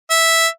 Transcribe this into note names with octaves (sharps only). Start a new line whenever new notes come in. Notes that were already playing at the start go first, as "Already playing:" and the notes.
E5